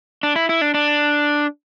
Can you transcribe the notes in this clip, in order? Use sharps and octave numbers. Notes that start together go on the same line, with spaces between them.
D4
E4
E4
D4
D4